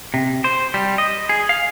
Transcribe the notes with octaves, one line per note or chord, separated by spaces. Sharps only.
C3
C5
G3
D#5
G#4
F5